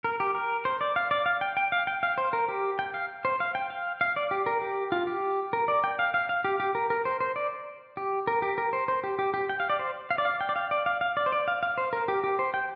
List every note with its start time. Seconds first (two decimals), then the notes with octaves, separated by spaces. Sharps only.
0.04 A#4
0.20 G4
0.35 A#4
0.65 C5
0.81 D5
0.96 F5
1.11 D5
1.26 F5
1.41 G5
1.57 G5
1.72 F5
1.87 G5
2.03 F5
2.18 C5
2.33 A#4
2.48 G4
2.79 G5
2.94 F5
3.25 C5
3.40 F5
3.55 G5
3.70 F5
4.01 F5
4.16 D5
4.31 G4
4.46 A#4
4.62 G4
4.92 F4
5.07 G4
5.53 A#4
5.68 D5
5.84 G5
5.99 F5
6.14 F5
6.29 F5
6.45 G4
6.60 G4
6.75 A#4
6.90 A#4
7.05 C5
7.20 C5
7.36 D5
7.97 G4
8.27 A#4
8.42 G4
8.58 A#4
8.73 C5
8.88 C5
9.04 G4
9.19 G4
9.34 G4
9.49 G5
9.60 F5
9.70 D5
9.79 C5
10.11 F5
10.18 D5
10.25 F5
10.41 G5
10.49 D5
10.56 F5
10.71 D5
10.86 F5
11.01 F5
11.17 D5
11.26 C5
11.32 D5
11.48 F5
11.63 F5
11.78 C5
11.93 A#4
12.08 G4
12.24 G4
12.39 C5
12.54 G5